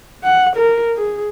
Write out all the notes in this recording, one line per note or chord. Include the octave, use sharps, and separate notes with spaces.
F#5
A#4
G#4